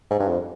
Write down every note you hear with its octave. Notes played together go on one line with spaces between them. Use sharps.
G#2
G2
F2